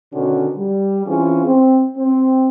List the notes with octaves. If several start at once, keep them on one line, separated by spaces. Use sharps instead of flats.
B2 D3 D#3 C#4 F#4
G3
E3 C4 C#4 F4 G#4
C4
C4